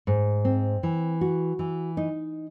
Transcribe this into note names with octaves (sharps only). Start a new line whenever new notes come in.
G#2
C4
E3
F#4
E3
D#4